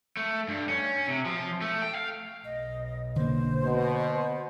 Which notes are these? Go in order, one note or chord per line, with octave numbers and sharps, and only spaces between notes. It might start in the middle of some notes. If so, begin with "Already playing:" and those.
A3
G2
C#4
C3
F3
A3
G5
F5
B1 D#5
D3 A#3 C5
B2